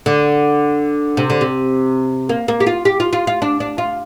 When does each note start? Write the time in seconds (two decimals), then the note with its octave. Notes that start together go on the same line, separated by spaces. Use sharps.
0.06 D3
1.17 C3
1.30 D3
1.41 C3
2.29 A#3
2.48 A#3
2.60 G4
2.67 F4
2.85 G4
3.00 F4
3.13 F4
3.27 F4
3.42 D4
3.60 D4
3.78 F4